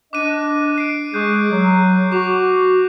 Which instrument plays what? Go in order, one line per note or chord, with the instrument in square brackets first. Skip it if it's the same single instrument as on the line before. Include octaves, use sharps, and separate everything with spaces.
[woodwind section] D4 D#5 [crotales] D6 F#6 D#7
[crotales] C7 D7
[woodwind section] G#3 G#4 [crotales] C#6 F#6 G6
[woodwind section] F#3
[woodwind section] F#4 [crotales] C#6 D6 F7